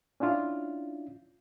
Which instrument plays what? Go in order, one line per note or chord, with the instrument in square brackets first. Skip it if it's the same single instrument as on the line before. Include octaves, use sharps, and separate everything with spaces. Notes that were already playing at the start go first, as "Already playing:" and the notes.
[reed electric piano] C#4 D4 E4 F4